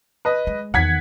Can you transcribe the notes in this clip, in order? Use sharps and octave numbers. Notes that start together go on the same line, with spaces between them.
B4 D#5
G#3
E2 D#3 F#5 G#6 B6